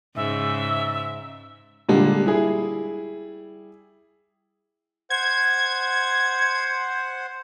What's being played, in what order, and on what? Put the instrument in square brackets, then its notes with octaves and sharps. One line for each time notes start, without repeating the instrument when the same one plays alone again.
[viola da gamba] G#2 C#3 [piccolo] E5
[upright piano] A#2 D3 G3 G#3
G3 E4 G#4
[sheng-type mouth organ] C5 F#5 [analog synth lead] G#6